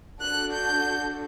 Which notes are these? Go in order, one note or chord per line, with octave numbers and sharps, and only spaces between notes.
D4 F#4 A4 F#6
G6